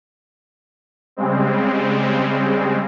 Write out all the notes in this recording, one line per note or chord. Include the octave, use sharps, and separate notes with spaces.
C#3 G3 G#3 C4